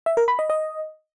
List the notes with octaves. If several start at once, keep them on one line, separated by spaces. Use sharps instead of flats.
E5
A#4
B5
D#5
D#5